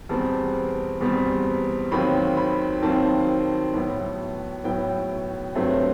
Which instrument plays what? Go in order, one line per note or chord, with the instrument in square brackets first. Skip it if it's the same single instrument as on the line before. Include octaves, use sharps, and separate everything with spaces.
[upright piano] E2 B2 G3 C4 A5
E2 B2 G3 C4
D#2 D#3 F#3 C4 B5
B5
D#2 D#3 F#3 C4 A5
A2 F#3 B3
A2 F#3 B3 G5
G2 F#3 A3 C4